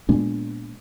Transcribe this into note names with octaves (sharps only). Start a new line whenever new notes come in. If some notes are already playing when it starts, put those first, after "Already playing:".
A#2 G#3 B3 D4